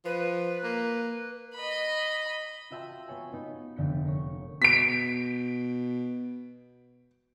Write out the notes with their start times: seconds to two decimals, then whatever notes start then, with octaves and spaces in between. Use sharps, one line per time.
0.05 F3 B4
0.64 A#3
1.55 D#5 B5
2.71 F4 F#4 E5 G5 A5 C6
3.08 B3 C#5 G#5
3.33 B3 D#4
3.76 F1 D3 G6 B6 C#7
4.04 A#4 C#5
4.62 B2 B6 D7